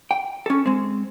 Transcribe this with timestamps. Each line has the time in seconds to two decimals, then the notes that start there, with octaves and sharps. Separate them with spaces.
0.11 G5
0.46 C#4 A4
0.66 G#3 C4